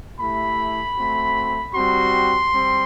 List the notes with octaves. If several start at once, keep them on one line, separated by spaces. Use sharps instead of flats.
A3 E4 G4 B5
A3 C4 F#4
G3 C4 F#4 C6
G3 C4